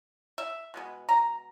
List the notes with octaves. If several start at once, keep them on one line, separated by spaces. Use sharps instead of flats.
E5
B2 G#3 B3
A#5